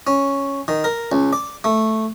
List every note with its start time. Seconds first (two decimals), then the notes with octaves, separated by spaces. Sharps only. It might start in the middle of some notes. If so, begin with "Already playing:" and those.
0.07 C#4
0.68 D#3
0.84 A#4
1.12 C#2
1.33 D5
1.64 A3